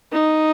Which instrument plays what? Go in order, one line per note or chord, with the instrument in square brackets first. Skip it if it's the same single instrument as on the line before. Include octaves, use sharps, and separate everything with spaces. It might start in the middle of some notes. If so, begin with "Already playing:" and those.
[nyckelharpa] D#4